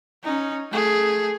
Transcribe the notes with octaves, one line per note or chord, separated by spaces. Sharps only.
C#4 D#4
A3 G#4